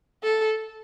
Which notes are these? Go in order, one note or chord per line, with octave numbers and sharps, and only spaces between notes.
A4